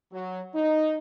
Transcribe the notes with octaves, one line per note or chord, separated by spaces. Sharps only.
F#3
D#4